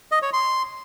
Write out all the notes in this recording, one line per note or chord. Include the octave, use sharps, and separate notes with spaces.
D#5
C#5
C6